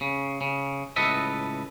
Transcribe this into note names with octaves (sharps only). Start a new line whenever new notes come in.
C#3
C#3
C#2 A2 A4 B4 D#5 E5